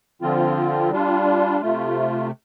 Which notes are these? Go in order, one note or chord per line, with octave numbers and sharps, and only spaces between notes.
D3 F3 C4 F4
G3 D4 F4
C3 A3 F4